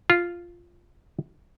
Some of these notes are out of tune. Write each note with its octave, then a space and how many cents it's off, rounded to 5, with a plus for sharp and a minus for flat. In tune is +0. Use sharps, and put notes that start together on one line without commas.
F4 -5